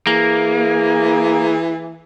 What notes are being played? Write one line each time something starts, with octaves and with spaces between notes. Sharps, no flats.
E3 A#3 G#4